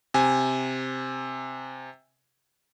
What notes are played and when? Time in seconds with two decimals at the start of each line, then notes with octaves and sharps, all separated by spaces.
0.14 C3 G#5